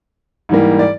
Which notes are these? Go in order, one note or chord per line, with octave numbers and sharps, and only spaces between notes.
G#2 E3 G3 A#3
D5